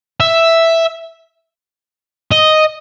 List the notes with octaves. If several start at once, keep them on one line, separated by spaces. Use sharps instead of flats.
E5
D#5